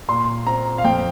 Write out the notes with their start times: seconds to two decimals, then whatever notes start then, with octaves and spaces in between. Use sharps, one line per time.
0.08 A#2 C6
0.46 C4 A#5
0.78 F5
0.84 F2 G5